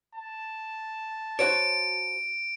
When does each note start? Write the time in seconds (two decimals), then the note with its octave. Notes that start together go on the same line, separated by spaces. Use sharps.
0.15 A5
1.39 F#4 C5 C#5 D7